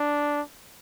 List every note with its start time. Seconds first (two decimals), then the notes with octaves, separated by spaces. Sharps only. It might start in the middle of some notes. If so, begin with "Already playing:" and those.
Already playing: D4